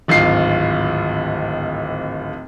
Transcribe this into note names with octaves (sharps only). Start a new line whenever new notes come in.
D1 G#1 F4 C7